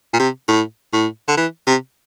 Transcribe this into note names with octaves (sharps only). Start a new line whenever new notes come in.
A#2
C3
A2
A2
D3
E3
C3